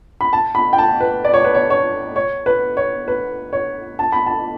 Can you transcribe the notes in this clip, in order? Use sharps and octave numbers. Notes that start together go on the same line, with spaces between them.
B5
A5
B5
G5
A5
B4
D5
C#5
B4
C#5
C#5
C#5
B4
C#5
B4
C#5
A5
B5
A5